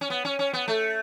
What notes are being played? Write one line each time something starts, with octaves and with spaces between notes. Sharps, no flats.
C#4
B3
C#4
C#4
B3
A3